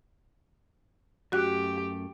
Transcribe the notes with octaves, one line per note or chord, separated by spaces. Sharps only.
F#2 A3 F#4 G4 F#6